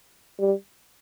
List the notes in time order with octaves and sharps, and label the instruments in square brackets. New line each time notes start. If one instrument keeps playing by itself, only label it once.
[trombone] G3